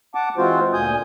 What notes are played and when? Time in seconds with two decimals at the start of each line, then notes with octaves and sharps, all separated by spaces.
0.15 F#5 A5 D6
0.38 E3 G#3 C4 F4 F#4 C5
0.73 D2 A#2 G#5 D#6 G6